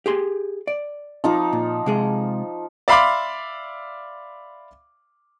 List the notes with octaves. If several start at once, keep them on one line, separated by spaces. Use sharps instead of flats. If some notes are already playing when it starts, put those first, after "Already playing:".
G4 G#4 C6
D5
F3 D#4 D6
A#2
C3 G#3 G#4
D5 E5 F5 B5 C6 D6